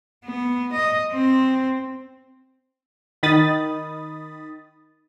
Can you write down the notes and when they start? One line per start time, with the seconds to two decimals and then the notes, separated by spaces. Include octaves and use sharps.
0.25 B3
0.73 D#5
1.13 C4
3.23 D#3 B5 D#6 A6